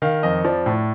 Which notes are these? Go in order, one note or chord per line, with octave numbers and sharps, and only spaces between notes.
D#3 F5
F2 D#5
F3 D5
A2